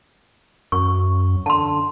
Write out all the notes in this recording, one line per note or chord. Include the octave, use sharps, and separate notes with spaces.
F#2 C#6
D3 A5 C6